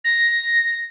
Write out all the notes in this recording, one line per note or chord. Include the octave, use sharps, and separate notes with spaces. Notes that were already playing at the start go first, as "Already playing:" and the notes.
A#6